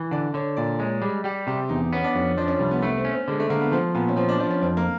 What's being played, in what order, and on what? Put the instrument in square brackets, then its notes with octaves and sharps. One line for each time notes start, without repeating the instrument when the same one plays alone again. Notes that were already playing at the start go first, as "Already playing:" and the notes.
Already playing: [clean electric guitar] E3
[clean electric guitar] D3 [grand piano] D5
[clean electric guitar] D3 [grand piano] C#5
[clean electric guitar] A#2 [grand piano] D5
[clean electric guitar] G#3 [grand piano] C#5
[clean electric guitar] G3 [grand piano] G#4
[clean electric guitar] G3 [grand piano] G4
[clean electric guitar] C3 [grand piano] G4
[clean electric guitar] E2 [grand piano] D#4
[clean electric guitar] B3 [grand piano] C#4
[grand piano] D4
[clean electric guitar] F2 [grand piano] C#4
[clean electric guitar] F3 [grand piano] D4
[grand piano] C#4
[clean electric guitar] C2 [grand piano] G3
[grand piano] B3
[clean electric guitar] A3 [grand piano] B3
[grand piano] C4
[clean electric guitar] C#4
[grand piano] C4
[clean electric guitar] D3 [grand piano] G#3
[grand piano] A3
[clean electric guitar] D3 [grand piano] A#3
[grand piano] B3
[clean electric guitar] F3 [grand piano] C4
[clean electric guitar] A#2 [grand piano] B3
[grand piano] C#4
[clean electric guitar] F3 [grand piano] C4
[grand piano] D4
[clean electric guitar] F3 [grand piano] D4
[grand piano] C#4
[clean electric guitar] F2 [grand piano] C4
[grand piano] A#3